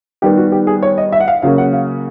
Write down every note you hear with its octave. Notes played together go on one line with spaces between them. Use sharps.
D#3 G3 B3 G4
F#4
G4
G#4
C#5
D#5
E5
F#5
F5
C#3 F#3 A#3 C#4 F5
F#5
F5